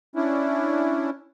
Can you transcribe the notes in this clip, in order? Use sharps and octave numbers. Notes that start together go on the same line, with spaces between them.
C#4 D4 E4